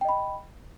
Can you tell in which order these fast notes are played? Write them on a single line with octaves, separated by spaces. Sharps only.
G5 D#5 B5